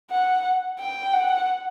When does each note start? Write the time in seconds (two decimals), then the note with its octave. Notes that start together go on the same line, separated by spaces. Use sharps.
0.12 F#5
0.79 G5
1.14 F#5